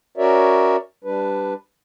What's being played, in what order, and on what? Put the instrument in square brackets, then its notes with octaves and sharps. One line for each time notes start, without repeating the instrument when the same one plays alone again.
[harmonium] C#4 F#4 A#4 C#5 D5 E5
G3 D4 B4